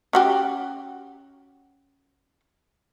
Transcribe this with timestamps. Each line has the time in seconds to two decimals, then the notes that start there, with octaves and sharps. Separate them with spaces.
0.13 C#4 F#4 G4